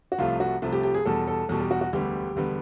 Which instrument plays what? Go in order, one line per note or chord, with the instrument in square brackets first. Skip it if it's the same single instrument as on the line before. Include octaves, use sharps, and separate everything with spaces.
[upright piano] F#4
[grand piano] C2 C3 F3 A3 [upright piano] F4
[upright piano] F#4
[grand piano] C2 C3 F3 A3
[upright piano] G4
G4
G#4
[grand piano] E2 B2 G3 [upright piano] A4
[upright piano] A4
[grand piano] E2 B2 G3 [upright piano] A4
[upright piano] G4
F#4
F#4
[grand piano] E1 D2 D3 G3 B3 [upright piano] G4
[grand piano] E1 D3 G3 B3